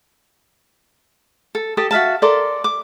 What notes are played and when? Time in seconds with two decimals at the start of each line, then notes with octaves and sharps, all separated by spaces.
1.55 A4
1.77 G4 A4 A5 D#6
1.91 F#4 E5 F5 A5
2.22 A4 A#4 D5 C6
2.64 D6